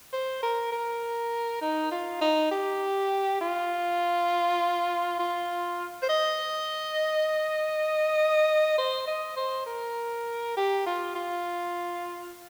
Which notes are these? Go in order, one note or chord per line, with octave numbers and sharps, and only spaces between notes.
C5
A#4
A#4
D#4
F4
D#4
G4
F4
F4
C5
D#5
C5
D#5
C5
A#4
G4
F4
F4